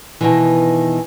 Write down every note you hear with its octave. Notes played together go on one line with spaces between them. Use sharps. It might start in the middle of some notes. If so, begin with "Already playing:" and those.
B2 D#3 E3